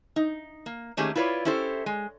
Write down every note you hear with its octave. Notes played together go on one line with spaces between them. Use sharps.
D#4
A#3
D#3 A3 A#3 C#4 G4 G#4
E4 F4 B4 C#5 D5
C#4 E4 G4 A4 C5
G#3